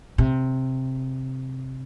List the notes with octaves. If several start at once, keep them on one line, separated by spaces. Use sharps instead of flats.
C3